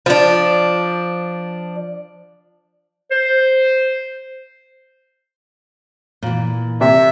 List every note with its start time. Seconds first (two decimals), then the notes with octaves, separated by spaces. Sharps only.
0.06 F3 D4
3.11 C5
6.23 A#2 E3
6.81 C3 E5